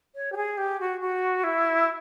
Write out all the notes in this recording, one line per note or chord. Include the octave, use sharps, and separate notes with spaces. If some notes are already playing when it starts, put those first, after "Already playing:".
C#5
G4
G#4
G4
F#4
F#4
E4